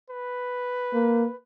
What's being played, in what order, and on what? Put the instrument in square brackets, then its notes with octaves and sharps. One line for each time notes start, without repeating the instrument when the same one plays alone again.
[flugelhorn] B4
[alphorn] A#3